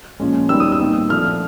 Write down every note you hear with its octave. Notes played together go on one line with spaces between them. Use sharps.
A#2 F3 G#3 C#4
D#3 G3 B3 D#4 E6
D#6
E6
A#2 G3 C4 D#4
F3 A3 D4 F6